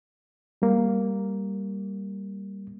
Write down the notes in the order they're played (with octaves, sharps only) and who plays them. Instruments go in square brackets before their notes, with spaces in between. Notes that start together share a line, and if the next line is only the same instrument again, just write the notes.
[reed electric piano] G3 A#3